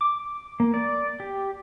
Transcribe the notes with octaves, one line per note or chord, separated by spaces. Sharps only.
D6
A#3
D5
G4